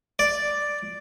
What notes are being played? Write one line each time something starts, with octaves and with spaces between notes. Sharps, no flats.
D5